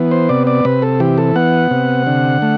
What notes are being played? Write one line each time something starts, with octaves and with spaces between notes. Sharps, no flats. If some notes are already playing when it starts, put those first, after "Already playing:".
Already playing: E3 B3
C5
C3 D5
D5
C3 B4
A4
E3 G4
A4
B3 F#5
C3
D3
A3